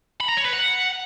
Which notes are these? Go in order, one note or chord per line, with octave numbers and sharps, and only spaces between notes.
B5
A#5
C#5
B4
F#5